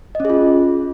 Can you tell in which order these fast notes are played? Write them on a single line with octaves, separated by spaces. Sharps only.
D#5 C#4 G#4 F4